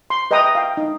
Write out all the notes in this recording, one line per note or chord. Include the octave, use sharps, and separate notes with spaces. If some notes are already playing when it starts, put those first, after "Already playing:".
C6
B4 D#5 E5 G5 A#5 D#6
F5 G5
D#4